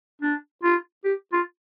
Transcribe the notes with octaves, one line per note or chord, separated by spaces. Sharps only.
D4
F4
G4
F4